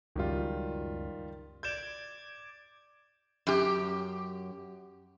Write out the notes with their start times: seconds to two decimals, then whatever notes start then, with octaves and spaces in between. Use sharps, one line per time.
0.16 C#2 F#2 D#3 G3 F4
1.63 D5 D6 G6 G#6 E7
3.47 F#2 G4